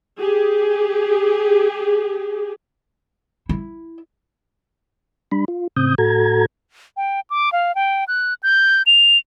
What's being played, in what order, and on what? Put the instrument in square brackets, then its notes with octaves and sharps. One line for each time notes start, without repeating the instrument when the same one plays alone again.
[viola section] G4 G#4
[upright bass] E4
[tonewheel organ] G3 D4 B5
F4
A2 C#3 C4 D#6 G6
A2 F#4 A4 A#5 G#6
[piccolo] G5
D6
F5
G5
F#6
G6
F7